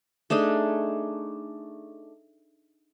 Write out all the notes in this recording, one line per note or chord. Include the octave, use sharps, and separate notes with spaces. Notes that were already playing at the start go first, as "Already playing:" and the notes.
A3 D4 D#4 G#4